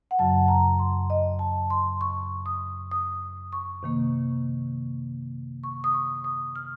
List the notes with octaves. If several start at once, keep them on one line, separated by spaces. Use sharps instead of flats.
F#5
F#2 C#3 F#3 A5
A#5
C6
D#5
A5
C6
C#6
D#6
D#6
C#6
C3 D#3 A#3
C#6
D#6
C#6
D#6
F6